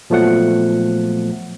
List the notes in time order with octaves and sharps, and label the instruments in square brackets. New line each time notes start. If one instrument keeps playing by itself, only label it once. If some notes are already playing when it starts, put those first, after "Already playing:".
[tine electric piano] A#2 F3 F#3 A3 B3 F#5